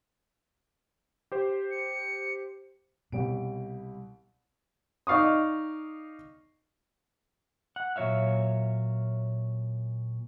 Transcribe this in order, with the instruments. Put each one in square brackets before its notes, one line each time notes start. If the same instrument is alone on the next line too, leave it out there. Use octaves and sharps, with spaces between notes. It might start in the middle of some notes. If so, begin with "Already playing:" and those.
[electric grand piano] G4 C5
[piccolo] C#7
[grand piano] C2 G4 D7 [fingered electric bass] B2
[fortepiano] D#4 D5 F5 C#6 D#6
[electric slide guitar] F#5
A#2 F#3 C#5 E5 F5